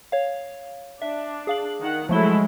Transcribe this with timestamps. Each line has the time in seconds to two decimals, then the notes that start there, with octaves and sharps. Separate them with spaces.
0.12 C#5 F5
1.02 D4 E5
1.47 G#4 F5 F#7
1.79 D#3 F#5
2.09 F3 F#3 G#3 A3 E4 A4 G7